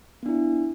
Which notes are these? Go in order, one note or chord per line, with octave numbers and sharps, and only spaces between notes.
B3 D4 E4